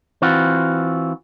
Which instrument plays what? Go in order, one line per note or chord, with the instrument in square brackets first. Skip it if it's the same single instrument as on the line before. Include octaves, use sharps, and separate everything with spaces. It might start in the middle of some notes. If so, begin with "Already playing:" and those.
[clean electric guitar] E3 C4 F4 F#4